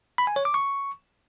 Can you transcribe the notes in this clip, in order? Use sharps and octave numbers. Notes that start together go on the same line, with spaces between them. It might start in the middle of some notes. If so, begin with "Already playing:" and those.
B5
G#5
C#5
D6
C#6